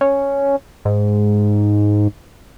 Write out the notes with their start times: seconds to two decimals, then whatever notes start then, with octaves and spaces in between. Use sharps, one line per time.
0.01 C#4
0.85 G#2